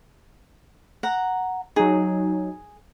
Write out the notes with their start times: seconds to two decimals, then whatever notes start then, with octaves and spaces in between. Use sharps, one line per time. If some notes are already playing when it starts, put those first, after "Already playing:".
1.03 F#5 A#5
1.76 F#3 D#4 G#4